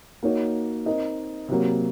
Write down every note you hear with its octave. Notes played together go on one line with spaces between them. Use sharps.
A#3 D#4 F#4 C#5
C4 D#4 A#4 D#5
C3 F#3 A#3